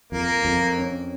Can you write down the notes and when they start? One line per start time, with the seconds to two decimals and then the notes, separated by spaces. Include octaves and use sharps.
0.12 F2 A#3
0.45 F2
0.78 C#4